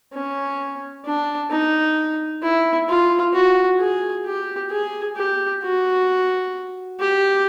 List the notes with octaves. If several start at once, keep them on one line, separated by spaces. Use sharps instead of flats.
C#4
D4
D#4
E4
F4
F#4
G#4
G4
G#4
G4
F#4
G4